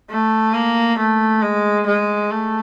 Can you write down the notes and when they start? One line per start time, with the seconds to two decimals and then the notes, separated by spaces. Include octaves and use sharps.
0.10 A3
0.54 A#3
0.98 A3
1.42 G#3
1.87 G#3
2.31 A3